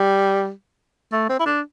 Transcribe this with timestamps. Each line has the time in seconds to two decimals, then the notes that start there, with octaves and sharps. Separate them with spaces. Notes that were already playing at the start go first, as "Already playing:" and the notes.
Already playing: G3
1.12 A3
1.29 C4
1.39 E4
1.46 D4